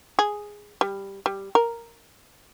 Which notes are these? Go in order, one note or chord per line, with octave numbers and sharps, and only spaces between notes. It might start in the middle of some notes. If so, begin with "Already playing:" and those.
G#4
G3
G3
A#4